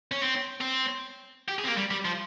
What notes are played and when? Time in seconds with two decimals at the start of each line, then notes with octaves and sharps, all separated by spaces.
0.11 C#4
0.21 C4
0.61 C4
1.49 G4
1.59 G#4
1.64 C4
1.68 A#3
1.78 G3
1.91 G3
2.05 F3